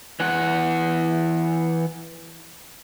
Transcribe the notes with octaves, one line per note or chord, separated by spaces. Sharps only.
E3 F#5